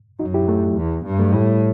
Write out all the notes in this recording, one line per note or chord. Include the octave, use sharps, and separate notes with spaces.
F#2 D#4 F#4
E4 G4
F#3 A3
E2
G2
F#3 A3
A2 G3